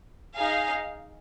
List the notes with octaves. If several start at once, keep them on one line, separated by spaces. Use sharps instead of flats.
D#4 G#4 F5